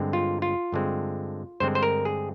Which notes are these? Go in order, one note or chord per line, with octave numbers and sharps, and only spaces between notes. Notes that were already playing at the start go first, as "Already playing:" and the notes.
Already playing: G2 D3 G#3 C4
F4
F4
G2 D3 G#3 C4
G2 D3 G#3 C4 C5
C5
A#4
G#4